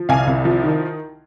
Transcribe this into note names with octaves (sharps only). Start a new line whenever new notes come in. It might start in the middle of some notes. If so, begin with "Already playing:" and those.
Already playing: F3
C2 F5 G#5
C2
F3
D#3